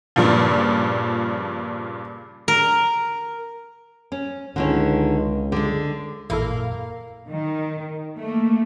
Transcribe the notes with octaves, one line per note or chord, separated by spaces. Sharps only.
G2 A#2 C#3 F3
A#4
C#4
C#2 D3 D#3 C#4
D3 G#3
A1 F#2 A#2 A#3 E4 A4 F5
D#3
A3 A#3